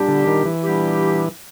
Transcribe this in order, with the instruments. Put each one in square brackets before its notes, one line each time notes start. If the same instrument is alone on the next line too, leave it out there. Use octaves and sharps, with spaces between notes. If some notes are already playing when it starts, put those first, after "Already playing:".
Already playing: [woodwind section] A#2 G3 B3 D4 G4
[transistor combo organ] D3
D#3
E3
[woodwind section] A#2 G3 B3 D4 G4